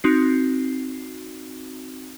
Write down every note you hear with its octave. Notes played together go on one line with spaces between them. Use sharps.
C4 D#4 F#4 C7